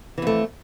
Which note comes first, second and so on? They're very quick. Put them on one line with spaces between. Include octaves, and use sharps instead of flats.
E3 F2 A3